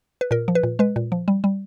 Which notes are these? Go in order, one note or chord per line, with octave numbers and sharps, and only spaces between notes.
B4
A#2 A#4
F3
B4
A#2
G#3 B4
A#2
F3
G3
G3